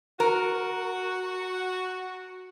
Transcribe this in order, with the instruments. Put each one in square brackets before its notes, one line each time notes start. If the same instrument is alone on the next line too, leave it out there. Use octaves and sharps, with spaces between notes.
[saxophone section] F#4 [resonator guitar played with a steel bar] A#4